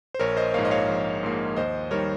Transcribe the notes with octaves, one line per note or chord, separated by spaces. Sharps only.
C5
A#1 A#4 C#5
C5 D#5
G#2 F3 A#3 C#5 F5
D#5
C#5 F5
A#1
G#2 F3 A#3
D#2 C5 D#5
D#3 G3 A#4 C#5